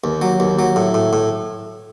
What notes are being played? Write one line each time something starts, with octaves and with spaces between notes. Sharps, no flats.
D#2
F#3
D#2
F#3
A2
A2
A2